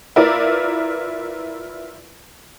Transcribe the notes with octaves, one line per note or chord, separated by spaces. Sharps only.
E4 F4 A#4 B4 D5